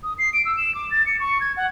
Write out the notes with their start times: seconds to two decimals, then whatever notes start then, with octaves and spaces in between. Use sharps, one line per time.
0.03 D#6
0.19 C7
0.33 D7
0.45 E6
0.57 E7
0.75 D6
0.91 A6
1.06 C#7
1.20 C#6
1.41 G#6
1.57 F#5